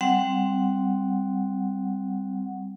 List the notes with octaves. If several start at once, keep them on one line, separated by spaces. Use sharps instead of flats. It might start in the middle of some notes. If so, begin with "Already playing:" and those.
G3 C4 F#5